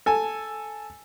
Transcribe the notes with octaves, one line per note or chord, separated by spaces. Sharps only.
A4 G#5